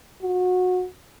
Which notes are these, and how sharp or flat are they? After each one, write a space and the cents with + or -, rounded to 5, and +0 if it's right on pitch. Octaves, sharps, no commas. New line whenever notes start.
F#4 -25